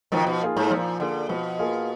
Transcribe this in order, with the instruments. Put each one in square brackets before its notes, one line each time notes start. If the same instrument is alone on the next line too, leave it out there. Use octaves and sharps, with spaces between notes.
[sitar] B2 D#3 [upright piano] F3
[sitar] B2
[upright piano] A#3 F4 G#4
[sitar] G#2
[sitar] A#2 [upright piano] F3
[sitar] D3 [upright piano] A#3 F4 G#4
[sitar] B2 [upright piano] F3
[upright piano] A#3 F4 G#4